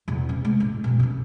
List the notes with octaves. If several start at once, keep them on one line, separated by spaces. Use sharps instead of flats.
E2 C3
C3 C#4
G#3
A1
G2 B2
C3 C#4